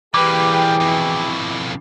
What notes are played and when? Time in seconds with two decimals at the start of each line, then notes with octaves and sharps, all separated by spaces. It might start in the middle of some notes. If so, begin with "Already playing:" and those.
0.14 E3 G3 A#3 G4 G#4 B4 G5 D6
0.81 F2 B2 E4